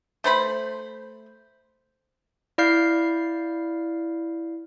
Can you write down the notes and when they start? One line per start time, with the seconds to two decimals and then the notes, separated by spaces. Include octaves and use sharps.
0.24 A3 C5 B5
2.58 E4 D5 F5 F6 G6 C7